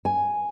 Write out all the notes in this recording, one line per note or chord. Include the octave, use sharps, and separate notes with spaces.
G#5